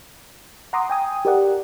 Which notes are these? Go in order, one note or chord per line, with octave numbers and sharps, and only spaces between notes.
F#5 A#5 C6 D6 D#6
G5 G#5 D#6
G4 A#4 D5 F#5